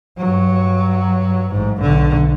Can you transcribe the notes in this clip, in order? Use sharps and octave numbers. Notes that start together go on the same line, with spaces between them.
G2 F#3
A1 G#2
B1 D3